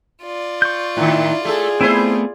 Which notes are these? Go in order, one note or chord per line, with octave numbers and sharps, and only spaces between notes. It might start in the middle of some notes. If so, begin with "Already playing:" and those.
F4 D5
C#6 G6
A2 D#3 E4
A3 G#4 A4
A3 B3 C4 E4 C5